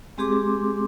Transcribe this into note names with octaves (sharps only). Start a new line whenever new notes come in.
G#3 C4 G4 G#4 C6 D6